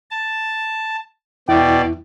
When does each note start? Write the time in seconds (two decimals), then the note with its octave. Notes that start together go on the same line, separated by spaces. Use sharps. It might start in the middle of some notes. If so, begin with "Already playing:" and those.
0.11 A5
1.48 E2 B2 E4 D5 G5